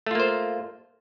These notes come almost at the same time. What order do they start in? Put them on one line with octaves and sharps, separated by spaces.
A3 F4 A#3 C5